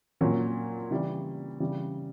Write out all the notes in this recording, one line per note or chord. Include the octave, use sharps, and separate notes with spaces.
A#2 F#3 C#4
C#3 E3 G3
C#3 E3 G3